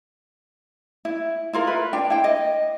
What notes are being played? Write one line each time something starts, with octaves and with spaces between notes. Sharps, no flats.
E4
E4 F4 A#4
B4
D4 G5
E4 G5
D#5